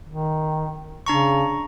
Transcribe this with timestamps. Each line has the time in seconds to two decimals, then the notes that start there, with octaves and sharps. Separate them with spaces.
0.07 D#3
1.06 C#3 D4 A#5 C#6